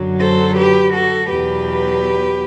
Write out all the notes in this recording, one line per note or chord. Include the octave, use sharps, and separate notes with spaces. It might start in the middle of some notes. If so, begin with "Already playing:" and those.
Already playing: F#2 D3 F#3
A4 C5
G4 B4
F#4 A4
E2 B2 F#3 G4 B4